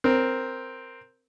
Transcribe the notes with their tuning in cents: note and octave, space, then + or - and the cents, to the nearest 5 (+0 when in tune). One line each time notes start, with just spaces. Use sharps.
C4 +0 A#4 +0